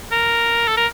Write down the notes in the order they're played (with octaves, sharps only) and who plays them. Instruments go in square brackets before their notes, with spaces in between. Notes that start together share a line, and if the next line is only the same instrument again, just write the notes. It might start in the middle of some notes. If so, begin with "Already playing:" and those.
[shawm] A#4
A4
A#4